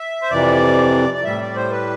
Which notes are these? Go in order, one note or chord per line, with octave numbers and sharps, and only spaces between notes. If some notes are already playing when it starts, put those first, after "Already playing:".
Already playing: E5
C5
F2 C3 E3 D5
D5
A2 G3 E5
D5
C5
B4